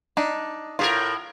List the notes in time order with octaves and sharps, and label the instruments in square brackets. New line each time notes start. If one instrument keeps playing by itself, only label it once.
[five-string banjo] D4 D#4
[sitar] A2 G4 A#4 [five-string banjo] F4